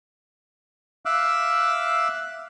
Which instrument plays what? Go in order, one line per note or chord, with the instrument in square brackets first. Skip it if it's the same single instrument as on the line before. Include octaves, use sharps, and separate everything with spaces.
[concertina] E5 F5 D6 E6 F#6